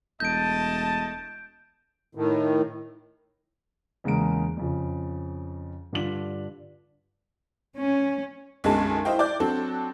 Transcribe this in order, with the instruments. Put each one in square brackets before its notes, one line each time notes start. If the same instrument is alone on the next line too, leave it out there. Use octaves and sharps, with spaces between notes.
[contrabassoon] E1 [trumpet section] A3 D#5 A5 [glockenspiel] G6 D7
[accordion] A2 D#3
[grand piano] E2 C#3 G#3 A#3 A#5 D7
F2 C#3 F3
G2 D3 D4 F4 B6 F#7
[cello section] C#4
[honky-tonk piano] B1 F#2 D3 G#3 G#4 A5
E4 C5 D#5 F5 G5
D5 D6 G6
F#3 C4 D4 F#4 A4